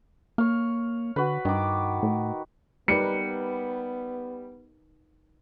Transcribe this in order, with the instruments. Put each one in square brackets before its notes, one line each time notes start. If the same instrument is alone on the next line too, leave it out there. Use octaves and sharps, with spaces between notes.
[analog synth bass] A#3 [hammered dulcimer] C#5 F5
[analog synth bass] D3 [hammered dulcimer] F#4 B4
[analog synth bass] G2 [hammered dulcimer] D#3 D6
[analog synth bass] A2
[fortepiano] G3 [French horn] B3 [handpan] D#4 A#4 B4 [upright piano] C#7